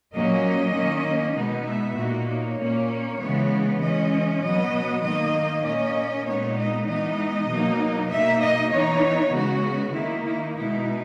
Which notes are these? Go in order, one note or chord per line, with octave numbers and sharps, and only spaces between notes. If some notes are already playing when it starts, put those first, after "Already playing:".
A#2 F#3 A#3 C#4 D#5
D#3 A#3 C#4
B2 G#3 B3 D#4
E5
A#2 A#3 D#4 F#4
C#5
A#2 A#3 C#4
C#3 E3 G#3 B3
E3 G#3 C#4 D#5
B2 F#3 B3 D#5
D#3 A#3 D#4 D#5
A#2 A#3 C#4 D#5
A#2 G#3 B3 D#4 C#5
D#5
E3 G#3 B3 D#4 D#5
B2 F#3 A#3 D#4
B2 A#3 D#4 E5
D#5
E3 B3 D#4 C#5
C#3 G#3 B3 F#4
D#3 A#3 D#4 E4
E4
B2 G#3 B3 D#4 E4